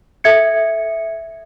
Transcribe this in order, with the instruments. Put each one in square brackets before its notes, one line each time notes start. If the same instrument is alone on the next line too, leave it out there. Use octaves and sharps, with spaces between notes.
[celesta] A4 E5 G#6 C#7